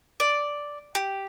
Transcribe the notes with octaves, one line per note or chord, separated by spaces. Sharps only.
D5
G4